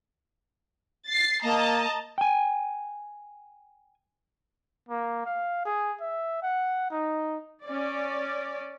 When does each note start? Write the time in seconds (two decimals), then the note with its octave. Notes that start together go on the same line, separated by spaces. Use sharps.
1.06 A6 C7
1.43 A#3 D#5 A5 A#5
2.18 G5 G#5
4.89 A#3
5.26 F5
5.65 G#4
6.01 E5
6.43 F#5
6.91 D#4
7.66 C#4 D5